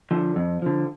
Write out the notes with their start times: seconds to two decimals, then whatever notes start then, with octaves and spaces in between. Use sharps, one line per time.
0.11 D3 F3
0.36 F2
0.62 D3 F3